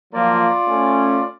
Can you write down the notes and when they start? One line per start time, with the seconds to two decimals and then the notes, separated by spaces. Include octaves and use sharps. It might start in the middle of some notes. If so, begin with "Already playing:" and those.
0.14 F3 F#3 A#3 F4 D5
0.68 A3 C#4